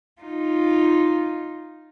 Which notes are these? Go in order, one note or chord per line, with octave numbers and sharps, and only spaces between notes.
D#4 F4